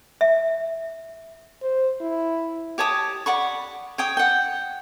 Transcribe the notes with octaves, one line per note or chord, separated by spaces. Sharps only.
E5
C5
E4
G4 C#5 A5 D#6
D5 F#5 B5 C#6
C#5 G5 D#6
F#5 G5